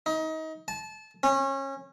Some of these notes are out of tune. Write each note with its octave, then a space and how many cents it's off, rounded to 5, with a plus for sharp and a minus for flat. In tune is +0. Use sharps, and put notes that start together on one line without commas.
D#4 +30
A5 -25
C#4 -30